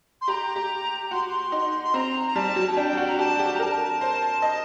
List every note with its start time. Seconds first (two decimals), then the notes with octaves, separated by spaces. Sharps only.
0.21 C6
0.28 G4 A#5
0.56 G4
1.11 F#4 C6
1.28 C6
1.52 D#4
1.83 C6
1.94 C4 A#5
2.27 A#5
2.35 G3 A5
2.56 F#3
2.71 A5
2.77 D4 G5
2.97 F#4
3.07 A#5
3.18 G4 A5
3.39 G4
3.55 A#5
3.59 A#4 A5
4.01 C5
4.42 D#5